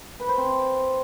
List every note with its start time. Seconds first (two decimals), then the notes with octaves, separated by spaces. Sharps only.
0.20 B4
0.29 C5
0.38 C4